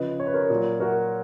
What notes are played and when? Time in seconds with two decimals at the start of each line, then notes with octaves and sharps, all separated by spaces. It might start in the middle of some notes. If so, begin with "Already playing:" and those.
Already playing: C#3 F3 B4 D#5
0.20 C#5
0.27 B4
0.34 A#4 C#5
0.50 A#2 F#3
0.80 F#4 A#4